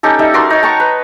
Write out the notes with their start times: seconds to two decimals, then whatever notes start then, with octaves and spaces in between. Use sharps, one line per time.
0.03 C#4 D#4 G4 A4
0.19 G3 D#4 E5
0.34 F#4 A#4 D5 C6
0.50 D#4 C#5
0.62 G5 A5 A#5 C#6
0.80 B4